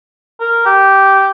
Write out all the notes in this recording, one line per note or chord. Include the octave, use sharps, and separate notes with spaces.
A#4
G4